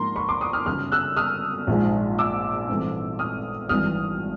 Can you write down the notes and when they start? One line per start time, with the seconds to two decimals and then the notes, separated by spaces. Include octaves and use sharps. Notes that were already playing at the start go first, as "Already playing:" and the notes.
Already playing: G#2 F3 A#3 D4 A#5 C6
0.16 B5 C#6
0.29 C6 D6
0.41 C#6 D#6
0.53 D#6 F6
0.66 G1 F#2 C#3 D#6 F6
0.92 E6 F#6
1.17 D#6 F6
1.67 A#1 G#2 F3 G#3
2.19 D6 E6
2.69 G#1 G2 E3 A3 C4
3.19 D#6 F6
3.69 G#1 G2 E3 D#6 F6